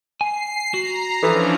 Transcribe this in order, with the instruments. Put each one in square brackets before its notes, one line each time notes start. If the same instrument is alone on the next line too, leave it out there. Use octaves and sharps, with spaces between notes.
[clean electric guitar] G#5 [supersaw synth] C7
[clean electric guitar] F#4 [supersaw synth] A#5
[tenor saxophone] E3 [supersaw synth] F3 C#4 D4 [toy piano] A4